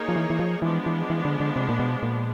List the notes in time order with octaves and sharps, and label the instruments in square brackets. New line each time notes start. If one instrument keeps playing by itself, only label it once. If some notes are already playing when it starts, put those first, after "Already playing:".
Already playing: [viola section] A#3 D#4 G#4 C#5
[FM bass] F3
E3
E3
F3
[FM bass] E3 [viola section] F3 G#3 B3 D4
[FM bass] E3
E3
D3
D3
C3
A#2
B2
A#2